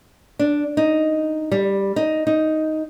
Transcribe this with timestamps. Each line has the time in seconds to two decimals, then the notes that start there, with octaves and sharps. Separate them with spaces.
0.39 D4
0.77 D#4
1.52 G3
1.96 D#4
2.27 D#4